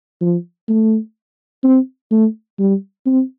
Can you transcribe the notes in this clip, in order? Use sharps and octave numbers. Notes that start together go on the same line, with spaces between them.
F3
A3
C4
A3
G3
C4